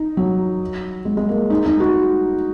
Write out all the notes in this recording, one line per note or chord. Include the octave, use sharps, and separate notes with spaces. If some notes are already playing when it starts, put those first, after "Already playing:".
Already playing: D#4
F#3
G#3
G#3
A#3
D#4
D#4
F#4